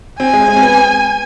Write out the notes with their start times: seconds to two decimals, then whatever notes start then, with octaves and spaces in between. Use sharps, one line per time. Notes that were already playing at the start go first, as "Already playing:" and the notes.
0.20 C4 G#5
0.34 G#3
0.48 G#3
0.56 C4
0.62 B3